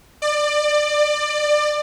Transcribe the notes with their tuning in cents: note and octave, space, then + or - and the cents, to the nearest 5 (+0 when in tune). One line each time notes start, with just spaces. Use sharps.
D5 +25